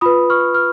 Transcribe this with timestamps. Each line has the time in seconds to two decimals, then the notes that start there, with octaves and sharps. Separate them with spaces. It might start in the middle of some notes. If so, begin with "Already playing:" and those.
0.01 F4 B4 B5 D#6
0.30 C#6 F6
0.54 F6